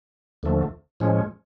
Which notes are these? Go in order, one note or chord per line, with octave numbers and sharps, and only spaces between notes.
D#2 D3 F3 A3
A2 F3 G#3 C#4